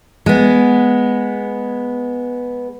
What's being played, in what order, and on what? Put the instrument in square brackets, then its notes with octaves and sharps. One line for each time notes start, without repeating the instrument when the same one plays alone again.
[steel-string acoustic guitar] G#3 B3